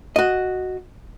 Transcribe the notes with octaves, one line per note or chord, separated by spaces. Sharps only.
F#4 D#5